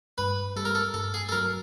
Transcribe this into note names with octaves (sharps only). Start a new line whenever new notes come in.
G2 B4
G3 A4
A#4
A4
G2 A4
G#4
A4
F#3 A#4